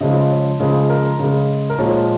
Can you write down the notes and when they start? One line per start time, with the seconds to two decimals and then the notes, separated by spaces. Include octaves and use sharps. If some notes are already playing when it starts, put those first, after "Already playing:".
0.01 C#3 F3 G#3 D#5
0.31 C#5
0.60 C#3 F3 G#3 G#4
0.89 A#4
1.19 C#3 G#3
1.70 A#4
1.79 A#2 F3 G#3 C#5